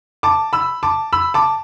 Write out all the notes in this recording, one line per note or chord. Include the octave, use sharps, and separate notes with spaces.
A5 D6
B5 E6
A5 D6
B5 E6
A5 D6